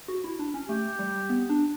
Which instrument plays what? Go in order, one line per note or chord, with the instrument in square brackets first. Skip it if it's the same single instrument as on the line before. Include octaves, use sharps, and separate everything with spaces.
[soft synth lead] F#4
E4
D4
C#4
[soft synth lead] A3 [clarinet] G4
[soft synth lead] G3
B3
D4